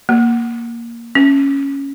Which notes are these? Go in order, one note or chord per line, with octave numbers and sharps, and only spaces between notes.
A#3
C#4